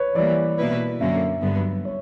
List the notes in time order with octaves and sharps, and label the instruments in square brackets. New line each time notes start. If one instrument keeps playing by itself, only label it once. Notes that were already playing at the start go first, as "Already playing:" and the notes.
Already playing: [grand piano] B4 C#5
[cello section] E3 G3 A#3 [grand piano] D5
[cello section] B2 A#3 E4 B4
[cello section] F#2 D3 A#3 C#4 [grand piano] E5
[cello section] G2 D3 F#3 B3
[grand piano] C#5